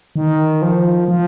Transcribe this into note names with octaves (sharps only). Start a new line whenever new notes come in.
D#3
F3
F3